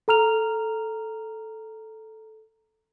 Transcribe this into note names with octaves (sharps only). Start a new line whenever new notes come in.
A4 A#5 F6 F7